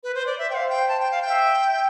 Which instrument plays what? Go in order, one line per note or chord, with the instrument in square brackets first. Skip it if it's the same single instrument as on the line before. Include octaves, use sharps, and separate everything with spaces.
[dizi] B4
C5
D5
E5
[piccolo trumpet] C5 [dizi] G5
[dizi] F5
G5
A5
G5
F5
G5
[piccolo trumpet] E5